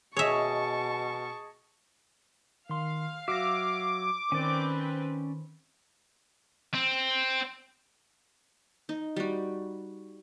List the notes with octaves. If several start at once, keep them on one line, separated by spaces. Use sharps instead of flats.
B2 G#4 C#5 D#5 E5 A5 C#6
D#3 F5 C6
F#3 F#4 E5 D6 A#6
D#3 C4 C#4 B4 D5
C4
D#4
G3 F#4